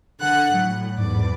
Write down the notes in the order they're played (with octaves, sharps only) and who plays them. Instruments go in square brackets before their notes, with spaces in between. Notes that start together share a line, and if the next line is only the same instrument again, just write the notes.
[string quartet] D3 F#5 F#6
[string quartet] A2 [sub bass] F#3
[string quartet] E2 D5 [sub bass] G#2